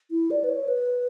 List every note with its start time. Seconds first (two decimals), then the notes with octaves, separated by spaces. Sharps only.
0.11 E4
0.31 D5
0.44 B4
0.49 C#5
0.68 B4